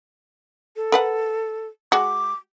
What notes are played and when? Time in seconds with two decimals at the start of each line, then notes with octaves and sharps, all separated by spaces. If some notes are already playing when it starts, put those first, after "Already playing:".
0.76 A4
0.92 A#4 B4 F#5
1.92 G#3 F#4 D6